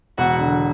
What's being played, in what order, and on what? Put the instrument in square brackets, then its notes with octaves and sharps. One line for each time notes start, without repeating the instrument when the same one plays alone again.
[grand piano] E1 [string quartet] F#4
[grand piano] D3